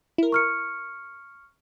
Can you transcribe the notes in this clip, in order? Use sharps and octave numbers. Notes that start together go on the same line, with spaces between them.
E4 A#4
C#6 F6 C#7